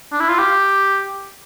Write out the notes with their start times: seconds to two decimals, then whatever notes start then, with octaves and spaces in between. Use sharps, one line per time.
0.12 D4
0.20 E4
0.30 F4
0.38 G4